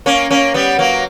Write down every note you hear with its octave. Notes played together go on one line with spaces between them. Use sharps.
A#3 C#4
A#3 C#4
G3 B3
F#3 A#3